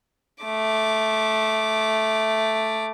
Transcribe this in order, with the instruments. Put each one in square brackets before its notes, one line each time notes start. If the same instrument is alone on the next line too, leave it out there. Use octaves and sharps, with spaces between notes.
[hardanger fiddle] A3 D6